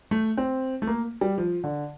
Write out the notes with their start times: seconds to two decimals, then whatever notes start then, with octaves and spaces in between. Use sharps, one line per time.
0.11 A3
0.37 C4
0.82 A3
0.87 A#3
1.21 G3
1.38 F3
1.64 D3